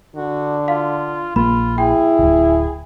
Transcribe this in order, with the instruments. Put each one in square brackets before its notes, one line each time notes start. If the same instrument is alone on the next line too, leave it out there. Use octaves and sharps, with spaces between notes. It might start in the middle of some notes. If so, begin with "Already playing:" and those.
[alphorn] D3 [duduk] F#4
[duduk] F4 [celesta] F5
[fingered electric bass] A#1 A#3 [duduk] F4 [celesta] B5
[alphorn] E4 [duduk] G#4 [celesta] G5
[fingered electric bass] D1 G1